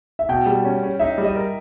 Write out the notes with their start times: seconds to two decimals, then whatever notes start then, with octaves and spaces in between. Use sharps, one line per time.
0.19 E5
0.29 B2 G5
0.46 G3
0.64 C#4
0.83 C#4
1.00 D#4 E5
1.18 G3
1.24 D#5
1.35 A#4